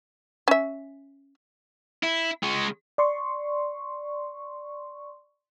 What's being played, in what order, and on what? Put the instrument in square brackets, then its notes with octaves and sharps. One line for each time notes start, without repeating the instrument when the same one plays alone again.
[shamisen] C#4 E5
[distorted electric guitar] E4
G#3 C#5
[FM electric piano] D5 C6 C#6